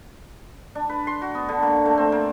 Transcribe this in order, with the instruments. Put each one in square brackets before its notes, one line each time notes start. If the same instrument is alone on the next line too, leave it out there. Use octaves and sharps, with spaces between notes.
[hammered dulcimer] D4
B4
C6
F#4
B3
D3
A#3
A3
C4
A#3